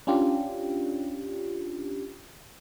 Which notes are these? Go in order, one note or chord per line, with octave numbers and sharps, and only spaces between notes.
C#4 D4 F4 G4